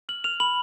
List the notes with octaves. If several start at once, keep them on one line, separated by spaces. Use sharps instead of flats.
F6 F#7
F6 F7
B5 F#7